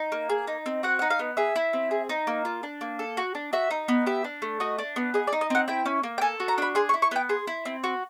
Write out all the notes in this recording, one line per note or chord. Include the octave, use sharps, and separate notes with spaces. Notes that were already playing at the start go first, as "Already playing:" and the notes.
Already playing: D#4
A#3
G#4
D#4
C4
F#4 F#5
D#4 F#5
F5
B3
G#4 E5
E4
C4
G#4
D#4
A#3
F4
D4
A#3
A4
F#4
D4
F#4 E5
D#4
B3
G4 E5
D4
A3
F#4 D#5
D4
B3
G#4 D#5
D5
D#4
D#5
C4 F#5
E4 G5
C#4
A#3
G5
A4 G#5
F#4
A#5
D4 B5
G#4 C6
C#6
E4
C#6
B3 G5
G#4 C6
E4
C4
F#4